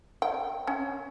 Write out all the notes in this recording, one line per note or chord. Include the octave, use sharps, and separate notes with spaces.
G5
C#4